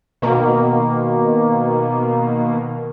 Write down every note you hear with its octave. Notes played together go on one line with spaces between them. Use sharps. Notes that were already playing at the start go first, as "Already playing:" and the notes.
B2 D#3 A#3